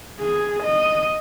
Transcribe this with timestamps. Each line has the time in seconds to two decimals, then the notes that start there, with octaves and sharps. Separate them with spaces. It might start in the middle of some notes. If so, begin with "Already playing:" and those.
0.19 G#4
0.63 D#5